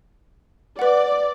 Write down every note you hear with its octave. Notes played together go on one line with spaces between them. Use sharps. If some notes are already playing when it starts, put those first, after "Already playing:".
B4 D5 F#5